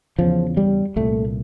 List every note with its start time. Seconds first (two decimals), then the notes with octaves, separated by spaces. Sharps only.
0.19 E2 C#3 F3
0.57 G3
0.96 C2 A#2 A3